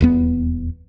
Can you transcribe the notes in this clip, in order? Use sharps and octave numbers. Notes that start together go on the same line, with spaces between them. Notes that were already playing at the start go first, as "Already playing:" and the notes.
D#1 E2 B3